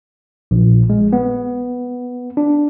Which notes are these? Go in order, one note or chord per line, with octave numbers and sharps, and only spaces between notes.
A#1
G#3
B3
D4